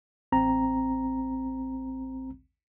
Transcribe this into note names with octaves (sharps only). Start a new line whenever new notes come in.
A1 C4 A#5